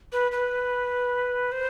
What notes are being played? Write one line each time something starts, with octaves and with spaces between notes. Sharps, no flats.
B4
B4
C5